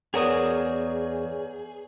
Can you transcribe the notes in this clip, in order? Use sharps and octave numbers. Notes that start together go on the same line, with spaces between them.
E2 F#4 G#4 A#4 B4 C#5 D5 D#6